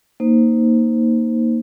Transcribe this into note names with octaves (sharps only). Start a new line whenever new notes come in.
A#3 D#4 C5